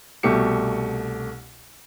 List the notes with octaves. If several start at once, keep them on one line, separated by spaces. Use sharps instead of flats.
C2 B2 A3 G4 C#7